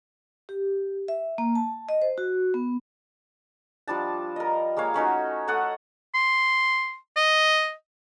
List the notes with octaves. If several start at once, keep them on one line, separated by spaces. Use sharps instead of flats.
G4
E5
A#3
A5
D#5
C5
F#4
B3
F3 G3 D4 A5
A#4 D#5
G#3 A#3 C#5 F5
A3 C#4 D#4 F#4
A3 A4 F#5 D#6
C6
D#5